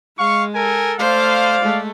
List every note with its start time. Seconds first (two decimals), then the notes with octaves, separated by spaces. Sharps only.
0.17 G#3 F5 C#6
0.55 A4 A#4 G#5
0.99 A3 C5 D5 F5
1.61 G#3 A3